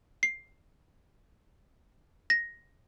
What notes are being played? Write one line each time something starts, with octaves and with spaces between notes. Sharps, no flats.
C7
A#6